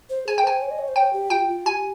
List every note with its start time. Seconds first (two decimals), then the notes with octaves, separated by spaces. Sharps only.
0.10 C5
0.27 G#4 G#5
0.38 G5
0.44 C5 G#5
0.62 C#5
0.71 D#5
0.79 C#5
0.88 C5
0.96 C#5 G5
1.13 G4
1.30 F4 G5
1.48 F4
1.66 G4 G#5